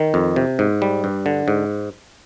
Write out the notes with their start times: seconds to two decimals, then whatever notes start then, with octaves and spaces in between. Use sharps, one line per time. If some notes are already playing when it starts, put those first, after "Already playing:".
Already playing: D#3
0.14 F2
0.36 C3
0.59 G#2
0.82 G3
1.04 G2
1.26 D3
1.48 G#2